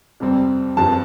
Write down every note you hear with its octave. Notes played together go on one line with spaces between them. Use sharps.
F2 C3 G3 C4
G2 F3 C4 A5